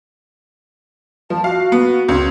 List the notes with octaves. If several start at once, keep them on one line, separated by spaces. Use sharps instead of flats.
F3 A5
F#4 F5
B3
C#2